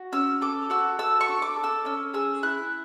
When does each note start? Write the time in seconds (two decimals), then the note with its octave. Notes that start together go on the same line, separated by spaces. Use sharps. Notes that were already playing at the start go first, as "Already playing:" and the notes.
Already playing: F#4
0.12 C#4 E6
0.41 A4 D6
0.70 F#4 E6
0.99 A4 E6
1.21 C#6
1.28 D4
1.42 D6
1.56 A4
1.64 E6
1.85 C#4 E6
2.14 G#4 E6
2.43 E4 F#6